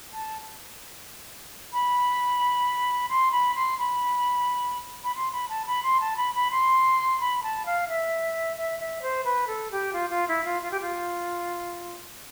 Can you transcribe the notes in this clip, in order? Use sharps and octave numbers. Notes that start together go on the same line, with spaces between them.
A5
B5
C6
B5
C6
B5
B5
C6
B5
A5
B5
C6
A5
B5
B5
C6
B5
A5
F5
E5
E5
E5
C5
B4
A4
G4
F4
F4
E4
F4
F4
G4
F4